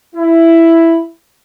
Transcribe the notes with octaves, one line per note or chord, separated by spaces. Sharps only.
E4